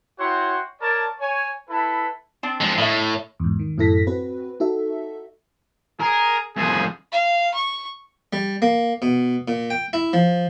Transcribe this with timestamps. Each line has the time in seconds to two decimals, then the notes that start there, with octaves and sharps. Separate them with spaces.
0.19 E4 F#4 C#5 F#5 G5 C6
0.81 A#4 C#5 D5 A5
1.20 C#5 G#5
1.69 E4 A4 B4 B5
2.43 C4 D4 D5
2.61 F3 G#3
2.78 A2 D#5 E5
3.40 E2 G#2
3.59 D#3
3.78 F#2 A2 E4 A4 A#6 B6
4.07 C4 F#4 B4
4.60 D#4 F#4 A4 E5
6.00 G#4 A#4
6.56 C2 F3 G#4
7.12 F5
7.54 C#6
8.33 G3
8.62 A#3
9.02 B2
9.48 A#2
9.70 G5
9.93 E4
10.13 F3